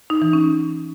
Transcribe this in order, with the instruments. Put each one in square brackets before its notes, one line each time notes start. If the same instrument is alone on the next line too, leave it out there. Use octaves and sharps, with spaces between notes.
[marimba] D#4
E3
C#4